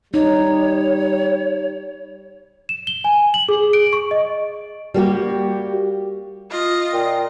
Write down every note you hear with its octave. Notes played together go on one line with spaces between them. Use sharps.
G3 D#4 C#5
E7
G7
G#5
F#7
G#4
D7
C#6
D#5
G3 A#3 F#4 G4
F4 D#5
A#2 G5